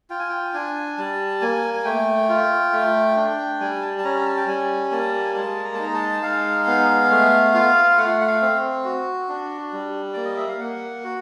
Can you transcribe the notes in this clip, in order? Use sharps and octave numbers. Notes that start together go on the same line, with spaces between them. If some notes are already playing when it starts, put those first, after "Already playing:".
F4 G5
G#5
G5
D4 G#5
G3 A5
A#3 G#5
G#5
A3 G5
F4
A3
D4
G3 G#5
A5
A5
C#4 A#5
A5
G5
G3 G#5
A#3 A5
G#5
G#3 A5
A#5
A5
D#4 A#5
A5
G#3 F5
B3
A3
F4
A3 F#5
F#5
F5
C4
F#4
D4
G3
A#3 D5
D#5
E5
F5
A#3 F#5
F#4